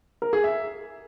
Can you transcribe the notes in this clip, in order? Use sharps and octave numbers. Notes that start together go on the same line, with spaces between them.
A#4
G#4
E5